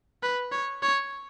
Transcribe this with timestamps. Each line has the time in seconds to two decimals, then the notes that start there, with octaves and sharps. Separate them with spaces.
0.23 B4
0.52 C#5
0.83 C#5